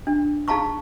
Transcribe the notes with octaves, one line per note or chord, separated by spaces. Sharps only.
D4
D#4 G#4 F5 A5 A#5 C#6